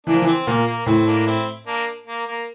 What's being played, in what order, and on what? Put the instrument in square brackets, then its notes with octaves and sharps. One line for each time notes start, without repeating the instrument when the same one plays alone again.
[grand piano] E3 [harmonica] A#3 D4
[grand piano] F3
E3
[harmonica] C4
[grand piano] A#2 [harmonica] A#3
[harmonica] A#3
[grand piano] A2 [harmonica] C4
[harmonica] A#3 D4
C4 E4
A#3 D4
A#3
A#3